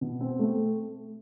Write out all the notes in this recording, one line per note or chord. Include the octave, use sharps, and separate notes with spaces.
B2
C4
A3